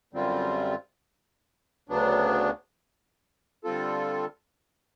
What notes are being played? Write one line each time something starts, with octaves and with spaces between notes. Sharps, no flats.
F#2 D3 G3 C4 F4
D2 C#3 F#3 B3 D4
D3 G3 C4 F4 A4